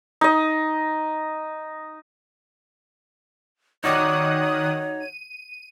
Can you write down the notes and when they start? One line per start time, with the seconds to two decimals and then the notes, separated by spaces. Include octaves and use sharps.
0.21 D#4 D#5
3.84 D#3 D#4 F#4 C#5 D5 D#6 F#6
5.00 D#7